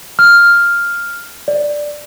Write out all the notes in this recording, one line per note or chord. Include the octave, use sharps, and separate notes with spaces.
F6
D5